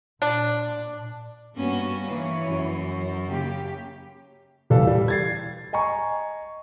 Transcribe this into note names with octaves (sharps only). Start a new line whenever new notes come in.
A#2 D4
G2 A#3 B3 C#4 F#4
E3 A#3 B4 C#5
F#2
C#3 A#3 G4
E1 E3 G3 A4 F5
G3
G#6 A6 C7
D#5 G#5 A#5 C#6